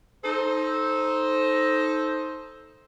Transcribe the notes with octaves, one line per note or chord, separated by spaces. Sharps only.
D#4 A4 C5